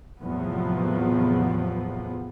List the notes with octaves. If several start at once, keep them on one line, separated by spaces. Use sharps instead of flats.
E2 A2 C3 F3 F#3 B3